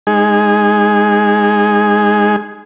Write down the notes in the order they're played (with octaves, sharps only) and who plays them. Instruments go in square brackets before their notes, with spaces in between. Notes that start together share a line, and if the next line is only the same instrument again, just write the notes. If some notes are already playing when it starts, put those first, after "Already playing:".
[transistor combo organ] G#3 D#4 G#4